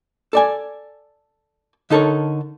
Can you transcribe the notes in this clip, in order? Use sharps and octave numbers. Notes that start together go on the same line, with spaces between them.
A4 D5 G#5
D3 D#4 A4 A#4 C#5